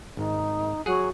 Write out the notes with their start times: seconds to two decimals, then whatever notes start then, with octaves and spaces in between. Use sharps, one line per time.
0.17 G#1 D#4
0.86 F#3 G#4 F#5